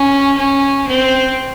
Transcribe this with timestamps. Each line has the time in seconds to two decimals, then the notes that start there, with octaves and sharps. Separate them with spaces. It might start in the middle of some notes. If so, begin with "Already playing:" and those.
Already playing: C#4
0.37 C#4
0.87 C4